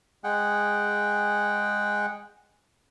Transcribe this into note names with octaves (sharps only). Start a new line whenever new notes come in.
G#3 G#4 F#5 G5